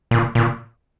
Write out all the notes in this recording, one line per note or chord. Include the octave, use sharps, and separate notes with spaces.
A#2
A#2